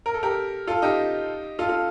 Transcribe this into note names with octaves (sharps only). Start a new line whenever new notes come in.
A#4
A4
G4 A#4
F4 A4
D#4 G4
F4 A4
F4 A4